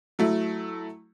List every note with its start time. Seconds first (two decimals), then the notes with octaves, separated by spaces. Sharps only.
0.19 F#3 A3 E4